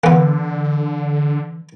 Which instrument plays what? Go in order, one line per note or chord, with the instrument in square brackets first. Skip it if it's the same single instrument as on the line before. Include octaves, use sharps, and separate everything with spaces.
[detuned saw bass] D3 [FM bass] E3 [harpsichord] A#3 B3